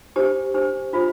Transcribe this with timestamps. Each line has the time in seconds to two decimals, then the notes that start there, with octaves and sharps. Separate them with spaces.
0.16 D4 G4 C5
0.54 D4 G4 C5
0.93 D4 F4 C5 E5 B5